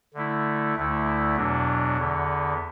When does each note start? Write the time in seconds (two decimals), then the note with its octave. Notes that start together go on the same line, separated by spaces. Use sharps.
0.14 D3 A3 E4
0.76 D2 D3 A3 E4
1.36 E2 B2 F#3 D4
1.97 E2 D3 B3